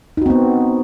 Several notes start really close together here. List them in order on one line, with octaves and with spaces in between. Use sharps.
D#4 F#4 C4 B3